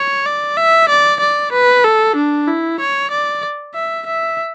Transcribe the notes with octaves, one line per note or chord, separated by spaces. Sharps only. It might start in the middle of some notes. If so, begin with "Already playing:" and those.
Already playing: C#5
D5
E5
D5
D5
B4
A4
D4
E4
C#5
D5
E5
E5